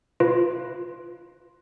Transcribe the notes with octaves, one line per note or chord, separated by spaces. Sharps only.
F4 B4